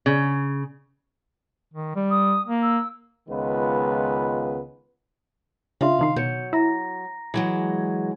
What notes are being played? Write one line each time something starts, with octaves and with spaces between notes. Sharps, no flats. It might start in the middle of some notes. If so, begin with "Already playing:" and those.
C#3
D#3
G3
D#6
A#3
E6
C#2 D#3 G#3 B3 F4 B4
C#3 D4 F4 E5 F5 C6
C3 D#3 D#4 C6 C7
B2 F#3 G6 C#7
E4 A#5 A#6
E3 F#3 G#3